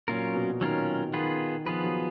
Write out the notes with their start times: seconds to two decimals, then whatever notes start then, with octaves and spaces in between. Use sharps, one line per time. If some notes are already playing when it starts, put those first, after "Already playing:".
0.08 A#2 F#3 C#4 F4 A#4
0.35 B2
0.61 D#3 F#3 C#4 F4 A#4
1.13 D#3 B3 F4 G#4 B4
1.66 F3 B3 F4 G#4 B4
1.84 F#3